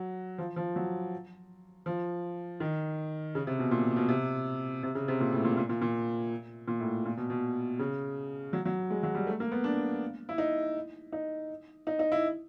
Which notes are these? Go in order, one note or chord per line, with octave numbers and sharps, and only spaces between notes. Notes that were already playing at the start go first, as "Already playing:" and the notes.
Already playing: F#3
F3
F3
F#3
F3
D#3
C#3
C3
B2
A#2
B2
C3
C3
C#3
C3
A#2
A2
A#2
A#2
A#2
A#2
A#2
A2
A#2
B2
B2
C#3
F#3
F#3
G#3
F#3
G3
A3
A#3
B3
D4
E4
D#4
D#4
D#4
D#4
E4